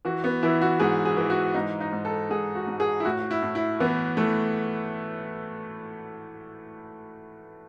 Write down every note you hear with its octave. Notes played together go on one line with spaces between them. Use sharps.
E3 F#4
B3
E3 E4
F#4
G#2 G#4
G#4
E3
F#4
G#2 D#4
D#4
G#2
A4
G#2 G#4
F#4
G#2
G#4
E4
A2 F#4
F#4
E4
A2
E4
E3 B3
E3 A3